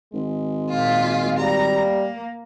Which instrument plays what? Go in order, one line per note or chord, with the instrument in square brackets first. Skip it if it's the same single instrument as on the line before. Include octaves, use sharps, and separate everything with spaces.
[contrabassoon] G#1 [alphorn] G#3
[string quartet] A#2 F4
[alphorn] G3 [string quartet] A#5
[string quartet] A#3